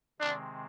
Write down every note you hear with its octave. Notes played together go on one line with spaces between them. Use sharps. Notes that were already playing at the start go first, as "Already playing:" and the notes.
C3 D#3 G#3 C4 D4